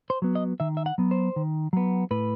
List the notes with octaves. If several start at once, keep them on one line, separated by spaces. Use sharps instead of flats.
C5
F#3 B3
D#5
D#3 E5
E5
F#5
F#3 B3
C5
D#3
F#3 B3
A2 B4